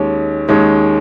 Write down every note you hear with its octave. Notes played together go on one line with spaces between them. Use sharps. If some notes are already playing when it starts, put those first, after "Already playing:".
Already playing: D#2 D#3 G#3 C#4
D#2 D#3 G#3 C#4